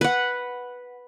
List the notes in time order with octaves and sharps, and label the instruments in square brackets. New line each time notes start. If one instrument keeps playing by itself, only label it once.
[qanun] B4 F#5